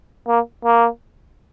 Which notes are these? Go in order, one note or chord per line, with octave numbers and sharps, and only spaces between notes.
A#3
A#3